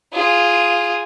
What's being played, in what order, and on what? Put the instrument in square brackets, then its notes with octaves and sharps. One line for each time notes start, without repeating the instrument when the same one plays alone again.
[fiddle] F4 G#4